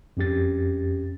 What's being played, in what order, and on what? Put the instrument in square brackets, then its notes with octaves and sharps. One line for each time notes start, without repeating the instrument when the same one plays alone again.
[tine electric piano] F2 C#4 G4 A6